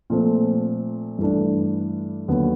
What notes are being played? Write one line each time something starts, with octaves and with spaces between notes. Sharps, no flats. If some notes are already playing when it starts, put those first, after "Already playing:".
A#2 F3 A3 C4
G2 E3 A3 D4
D#2 D3 F#3 B3